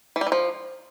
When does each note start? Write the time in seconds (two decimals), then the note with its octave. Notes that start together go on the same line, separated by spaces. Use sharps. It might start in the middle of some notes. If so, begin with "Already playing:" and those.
0.16 E3
0.21 G3
0.27 E3
0.32 F3